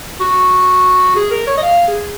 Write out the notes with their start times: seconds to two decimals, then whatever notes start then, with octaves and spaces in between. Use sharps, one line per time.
0.20 F#4
1.16 G#4
1.31 A#4
1.47 C#5
1.57 D#5
1.63 F5
1.88 G#4